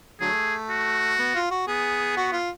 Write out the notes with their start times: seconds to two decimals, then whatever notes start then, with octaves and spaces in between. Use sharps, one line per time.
0.21 D3 F#3 A3 G#4
0.70 F#4
1.19 B3
1.35 F4
1.51 F#4
1.68 B3 G#4
2.17 F#4
2.33 F4